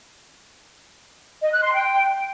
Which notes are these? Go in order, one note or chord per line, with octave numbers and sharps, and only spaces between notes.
D#5
F#6
C6
G5